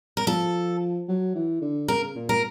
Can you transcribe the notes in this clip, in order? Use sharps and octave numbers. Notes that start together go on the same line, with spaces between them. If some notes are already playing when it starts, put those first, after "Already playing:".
A#4
F3 A4
F#3
E3
D3
C#3 A#4
A#2
A#4